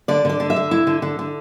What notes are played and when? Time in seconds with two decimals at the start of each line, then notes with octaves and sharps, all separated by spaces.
0.08 D3 D5
0.25 D3 D5
0.40 D3
0.50 E5
0.56 D3
0.71 E4
0.87 D3
1.02 D3
1.19 D3